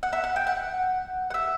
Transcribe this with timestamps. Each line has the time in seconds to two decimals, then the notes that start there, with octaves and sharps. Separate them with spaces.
0.03 F#5
0.13 E5
0.24 F#5
0.36 G5
0.47 F#5
1.30 F#5
1.34 E5